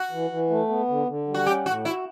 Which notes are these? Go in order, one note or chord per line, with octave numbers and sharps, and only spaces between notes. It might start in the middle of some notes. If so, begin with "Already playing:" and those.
Already playing: F#4
E3
E3
A3
B3
D3
D3
G3
F#4
C#4 G4
A2 F#4
E4 F#4